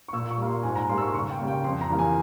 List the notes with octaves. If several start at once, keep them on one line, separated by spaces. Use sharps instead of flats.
C#6
A#2 E6
C#6
G3 A#3
C6
G#2 G#5
A#5
G3 A#3 C6
E6
C#6
C6
C#2 C#6
G5
C#3 G3 A#3
G5
F2 C6
A#5
E3 G3 A#3
G#5